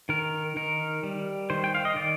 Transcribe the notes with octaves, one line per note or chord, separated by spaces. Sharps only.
D#3 A#4
D#3 A#4
G3
D#3 C5
G5
F5
D#5
D#3 D5